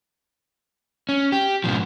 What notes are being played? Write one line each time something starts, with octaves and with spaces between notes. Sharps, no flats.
C#4
G4
G#2 B2 F3